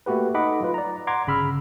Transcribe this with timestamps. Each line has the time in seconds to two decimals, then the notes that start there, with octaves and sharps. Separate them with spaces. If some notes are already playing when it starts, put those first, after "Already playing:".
0.06 A3 A#3 F#4 G4 B4
0.34 D#4 A4 D#5 F#5 B5 D6
0.60 F#3 F4 B4
0.74 D5 A#5
1.07 F#5 A#5 C6 D6 G#6
1.27 G1 C#3 B5 E6 F6